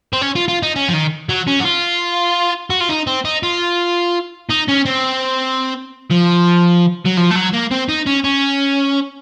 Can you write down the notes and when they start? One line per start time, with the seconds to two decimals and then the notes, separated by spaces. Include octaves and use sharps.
0.13 C4
0.21 C#4
0.35 F4
0.48 F4
0.63 D#4
0.76 C#4
0.89 F3
0.93 D#3
1.29 F#3
1.47 C#4
1.60 F#4
1.65 F4
2.70 F#4
2.80 F4
2.89 D#4
3.07 C4
3.25 D#4
3.43 F4
4.49 D#4
4.68 C#4
4.85 C4
6.10 F3
7.05 F#3
7.17 F3
7.30 A3
7.35 F#3
7.53 A#3
7.71 C4
7.89 D#4
8.07 C#4
8.24 C#4